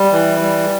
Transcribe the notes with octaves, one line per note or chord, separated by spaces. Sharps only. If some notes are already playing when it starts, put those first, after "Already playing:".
Already playing: G3
E3
G3